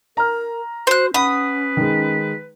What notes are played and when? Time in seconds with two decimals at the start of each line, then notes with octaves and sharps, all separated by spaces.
0.17 A#4 A#5 F6
0.87 F#4 C5 F#6
1.14 C#4 B4 F#5 B5 D#6
1.77 D#3 G#3